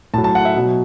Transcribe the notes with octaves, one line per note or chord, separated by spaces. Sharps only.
A2 F#3 A5
A5
F#5
E5
B2 F#3